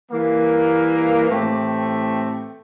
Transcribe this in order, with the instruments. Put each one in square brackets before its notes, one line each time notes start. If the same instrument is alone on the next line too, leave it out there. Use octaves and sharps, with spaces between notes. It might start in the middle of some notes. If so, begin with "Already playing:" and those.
[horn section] E3 G3 A#3
A2 E3 A3 C4 G4